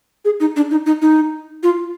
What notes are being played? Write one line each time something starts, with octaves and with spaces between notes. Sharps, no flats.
G#4
D#4
D4
D#4
D#4
D#4
F4